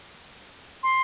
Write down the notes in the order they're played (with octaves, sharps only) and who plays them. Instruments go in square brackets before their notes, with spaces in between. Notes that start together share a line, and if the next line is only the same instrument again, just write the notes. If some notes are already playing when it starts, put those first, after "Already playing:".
[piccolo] C6